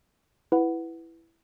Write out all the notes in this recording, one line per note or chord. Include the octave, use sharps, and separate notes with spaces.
E4 B4 F#5